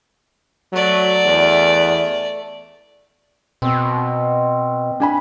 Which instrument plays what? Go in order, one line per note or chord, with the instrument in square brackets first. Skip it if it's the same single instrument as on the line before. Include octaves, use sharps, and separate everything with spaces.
[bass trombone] F#3 [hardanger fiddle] A3 D5
[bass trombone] E2
[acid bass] B2 [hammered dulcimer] C4
[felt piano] D4 G#5 B5